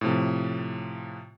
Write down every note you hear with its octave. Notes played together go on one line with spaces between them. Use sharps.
A2 C3 F3